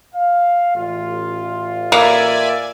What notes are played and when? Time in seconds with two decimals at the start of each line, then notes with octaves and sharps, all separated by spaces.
0.15 F5
0.75 A1 F4
1.92 A#3 D5 E5 G#5